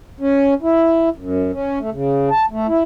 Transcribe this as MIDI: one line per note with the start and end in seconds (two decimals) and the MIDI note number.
0.20 0.54 61
0.62 1.09 64
1.17 1.52 42
1.53 1.79 61
1.80 1.90 57
1.91 2.29 49
2.30 2.46 81
2.51 2.67 57
2.68 2.83 64